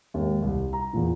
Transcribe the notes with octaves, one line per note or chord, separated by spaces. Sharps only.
D#2 G#2
C2
A#5
E2 A#2